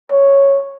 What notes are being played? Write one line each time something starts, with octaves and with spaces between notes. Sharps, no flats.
C#5